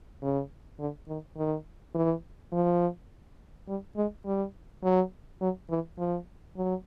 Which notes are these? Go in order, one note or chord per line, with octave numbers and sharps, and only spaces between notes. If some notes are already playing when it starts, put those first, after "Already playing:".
C#3
D3
D#3
D#3
E3
F3
G3
G#3
G3
F#3
F#3
E3
F3
F#3